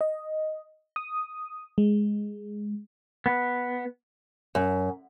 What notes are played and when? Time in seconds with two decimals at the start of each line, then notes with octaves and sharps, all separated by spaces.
0.01 D#5
0.96 D#6
1.78 G#3
3.26 B3
4.55 F#2